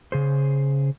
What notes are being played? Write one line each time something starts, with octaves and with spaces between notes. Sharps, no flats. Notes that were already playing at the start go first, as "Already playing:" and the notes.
C#3 G#4 C5